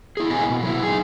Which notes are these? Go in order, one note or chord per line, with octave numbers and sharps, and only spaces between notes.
E4 G#4
A#2 B3 E4 D#5 F5 G#5
B2
F#3 E4
D#4 G#4